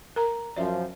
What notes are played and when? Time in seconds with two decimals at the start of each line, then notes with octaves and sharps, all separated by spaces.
0.16 A#4 A#5
0.56 F#2 F3 D5 E5